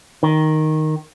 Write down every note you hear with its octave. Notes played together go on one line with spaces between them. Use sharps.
D#3